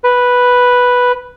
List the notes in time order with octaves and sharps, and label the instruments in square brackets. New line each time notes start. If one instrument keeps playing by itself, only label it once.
[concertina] B4